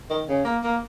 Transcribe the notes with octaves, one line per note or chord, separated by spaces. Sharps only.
D#3
C#3
A#3
A#3